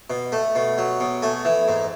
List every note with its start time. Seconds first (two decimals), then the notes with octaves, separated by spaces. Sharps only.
0.10 B2
0.32 A3
0.55 B2
0.78 F#3
1.00 B2
1.22 A3 G#5
1.45 E3
1.68 G#2